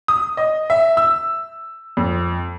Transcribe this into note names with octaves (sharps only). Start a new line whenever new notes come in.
D#6
D#5
E5
E6
F2